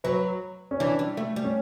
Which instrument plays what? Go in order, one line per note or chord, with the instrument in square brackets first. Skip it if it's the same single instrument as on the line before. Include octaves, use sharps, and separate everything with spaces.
[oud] F#3 [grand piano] B4
[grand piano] C#4
[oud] E3 [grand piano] D4
[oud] G3
A3
G3
[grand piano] C#4